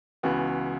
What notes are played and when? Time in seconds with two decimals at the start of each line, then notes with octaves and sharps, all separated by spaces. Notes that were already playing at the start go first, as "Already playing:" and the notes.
0.23 C#2 C#3 E3 B3 F#4